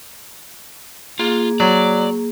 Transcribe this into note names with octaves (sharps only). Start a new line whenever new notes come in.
A#3 F4 G#4
F#3 D5